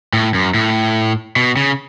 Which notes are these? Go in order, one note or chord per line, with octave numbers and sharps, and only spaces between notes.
A2
F#2
A2
B2
C#3